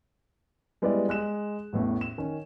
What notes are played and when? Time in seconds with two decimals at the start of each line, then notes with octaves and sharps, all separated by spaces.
0.82 G3 G#3 B3 E4 B4 D5
1.09 G#3 F#6 E7
1.73 A1 E2 A2
2.01 E7
2.18 D#3 C#4